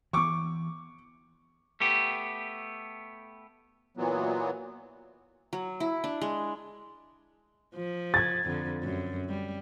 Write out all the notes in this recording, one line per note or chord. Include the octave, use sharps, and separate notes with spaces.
E3 B3 C#6 D6
A3 B3 G4
A#2 E3 F#3 B3
F#3
E4
D4
G#3
F3
G#6 A6
F2 D3
F#2
G3